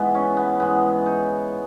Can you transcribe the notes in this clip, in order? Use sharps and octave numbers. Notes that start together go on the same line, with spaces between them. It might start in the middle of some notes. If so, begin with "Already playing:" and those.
Already playing: G#2 E3 G#3 B3
C#4
B3
G#2 E3 G#3 B3
D#4